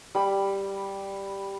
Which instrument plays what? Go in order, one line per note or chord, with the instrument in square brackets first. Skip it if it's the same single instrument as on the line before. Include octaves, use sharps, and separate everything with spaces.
[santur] G3 B5